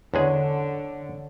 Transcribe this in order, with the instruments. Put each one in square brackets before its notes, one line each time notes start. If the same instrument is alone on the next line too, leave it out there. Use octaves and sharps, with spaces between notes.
[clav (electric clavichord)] E2 G#3 G#4 [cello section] D3 [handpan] C#5 F#5